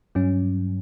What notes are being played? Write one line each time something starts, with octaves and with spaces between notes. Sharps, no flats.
G2 F#3 C#4